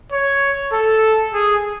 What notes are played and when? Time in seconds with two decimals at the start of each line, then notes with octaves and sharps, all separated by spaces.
0.12 C#5
0.73 A4
1.34 G#4